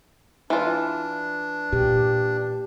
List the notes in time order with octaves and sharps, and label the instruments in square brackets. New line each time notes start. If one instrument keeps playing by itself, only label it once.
[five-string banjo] E3 F4 [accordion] D4
[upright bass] A#2 [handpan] G4